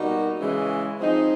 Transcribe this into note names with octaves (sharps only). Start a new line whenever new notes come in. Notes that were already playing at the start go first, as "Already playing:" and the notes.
Already playing: B2 G3 A#3 D#4 F#4
C#3 E3 G#3
F3 G#3 C4 D#4